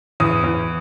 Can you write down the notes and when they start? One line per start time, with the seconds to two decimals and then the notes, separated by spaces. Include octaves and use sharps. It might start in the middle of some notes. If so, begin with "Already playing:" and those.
0.20 E2 D#6
0.44 E2